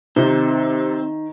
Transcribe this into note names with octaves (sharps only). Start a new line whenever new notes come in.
C3 D#3 C4